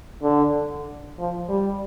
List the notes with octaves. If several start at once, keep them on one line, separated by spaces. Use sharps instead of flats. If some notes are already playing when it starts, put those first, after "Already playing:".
D3
F3
G3